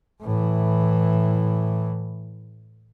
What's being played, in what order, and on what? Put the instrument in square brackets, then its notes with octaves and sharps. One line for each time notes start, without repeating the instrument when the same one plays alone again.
[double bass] A2 E3